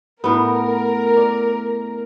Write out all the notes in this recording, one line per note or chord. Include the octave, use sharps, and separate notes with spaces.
A2 B3 A#4
D5